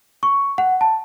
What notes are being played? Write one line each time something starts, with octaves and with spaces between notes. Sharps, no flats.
C#6
F#5
A5